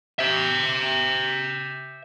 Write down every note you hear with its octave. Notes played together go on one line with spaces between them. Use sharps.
C5 E5